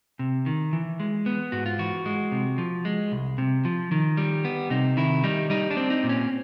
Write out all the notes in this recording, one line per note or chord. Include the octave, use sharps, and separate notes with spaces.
C3
D#3
E3
G#3
B3
G#2 F#4
F4
E3 F#4
G#3
C3
F3
G#3
C2
C3
F3
D#3
G3
B3
C3 D#4
D#3 E4
G3 D#4
G3 D#4
D4
C4
D#4
A#2
C#4